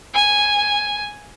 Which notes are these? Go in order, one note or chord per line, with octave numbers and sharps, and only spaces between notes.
G#5